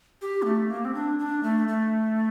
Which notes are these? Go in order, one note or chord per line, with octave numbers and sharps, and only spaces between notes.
G4
A#3
A3
A#3
C4
D4
D4
A3
A3